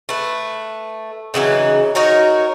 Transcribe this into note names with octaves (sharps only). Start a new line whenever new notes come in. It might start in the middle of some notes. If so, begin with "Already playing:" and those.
A3 B4
C#3 E3 F#3 D#4
D#4 F#4 A#4 C#5